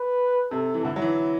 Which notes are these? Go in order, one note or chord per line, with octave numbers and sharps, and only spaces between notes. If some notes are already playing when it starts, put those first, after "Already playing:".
Already playing: B4
C3 A4
E3
D3 E4
F#3
E3